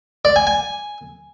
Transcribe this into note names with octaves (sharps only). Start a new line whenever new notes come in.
D5
G#5
G#5